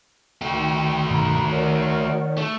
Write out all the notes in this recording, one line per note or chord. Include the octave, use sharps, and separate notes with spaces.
D#3 A3 F#4 G5
G2 B2 F#5 A#5 B5
A#4 C#5 D5 F#5
A3